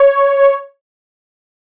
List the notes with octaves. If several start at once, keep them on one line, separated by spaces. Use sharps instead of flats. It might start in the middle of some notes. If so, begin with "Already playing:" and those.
Already playing: C#5